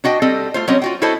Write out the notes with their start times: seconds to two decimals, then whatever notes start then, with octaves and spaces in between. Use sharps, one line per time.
0.04 D4 F#4 D#5 G5
0.22 G3 C4 A4 D#5
0.54 A3 F4 C5
0.68 F#3 G3 C4 C#4 D#5
0.82 F4 F#4 G5
1.02 E4 F#4 A4 C5 D#5